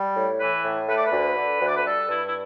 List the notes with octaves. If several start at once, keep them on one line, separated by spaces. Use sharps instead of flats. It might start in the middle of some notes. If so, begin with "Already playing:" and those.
Already playing: G3
A2
E3 B4
A2
A3 B4
D5
B4
D2
D3
D2
D5
B4
G3 A4
G2 E4
E4